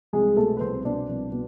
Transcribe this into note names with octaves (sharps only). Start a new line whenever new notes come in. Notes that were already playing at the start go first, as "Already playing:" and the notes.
C2 G#3 G#4
B2 A3 A4
B4
C2 C4 C5
B2 D4 D5
C2
B2